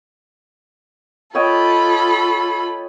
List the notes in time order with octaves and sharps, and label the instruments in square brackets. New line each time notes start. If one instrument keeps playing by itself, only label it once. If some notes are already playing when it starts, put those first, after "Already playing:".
[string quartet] F4 A4 B5 [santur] C#5 D#5 G5